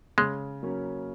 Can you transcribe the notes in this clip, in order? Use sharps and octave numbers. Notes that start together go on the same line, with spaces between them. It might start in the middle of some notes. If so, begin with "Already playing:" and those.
C#3 G#3
F#3 A#3 C#4